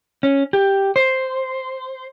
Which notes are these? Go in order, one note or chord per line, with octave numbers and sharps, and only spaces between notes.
C#4
G4
C5